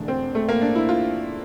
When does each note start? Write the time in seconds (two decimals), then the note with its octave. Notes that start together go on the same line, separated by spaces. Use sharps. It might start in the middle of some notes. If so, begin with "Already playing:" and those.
Already playing: E1 E2 D3 A3 D4
0.08 C4
0.35 A3
0.49 A#3
0.62 D4
0.75 E4
0.89 F4